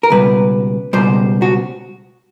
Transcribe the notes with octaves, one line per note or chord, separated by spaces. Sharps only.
A#4
C#2 B2 G3 B4
C#2 B2 G3 C5
F#4